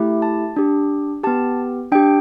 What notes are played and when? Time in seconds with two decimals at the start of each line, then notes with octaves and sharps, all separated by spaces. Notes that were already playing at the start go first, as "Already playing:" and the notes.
Already playing: A3 E4 G4
0.22 A5
0.56 D4 G4
1.23 B3 G4 A5
1.92 D4 G5
1.95 G4